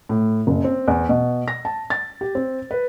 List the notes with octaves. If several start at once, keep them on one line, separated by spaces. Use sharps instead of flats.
A2
F#1
C4
E2
B2
A#6
A5
A6
G4
C4
B4